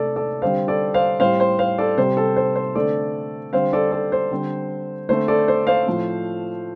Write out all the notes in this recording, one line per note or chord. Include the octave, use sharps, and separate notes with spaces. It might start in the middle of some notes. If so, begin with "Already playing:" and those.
Already playing: C3 A3 C4 A4 D5
A4 D5
D3 G3 C4 C5 F5
A4 D5
C5 F5
A2 G3 C4 C5 F5
C5
C5 F5
A4 D5
C3 G3 C4 C5
A4
C5
C5
D3 A3 C4 A4 D5
D3 G3 C4 C5 F5
A4 D5
A4 D5
C5
D3 G3 C4
D3 A3 C4 C5
A4 D5
C5
C5 F5
A2 F3 A3 C4